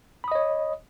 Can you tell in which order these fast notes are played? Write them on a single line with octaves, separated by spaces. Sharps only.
B5 D#6 D#5 C#5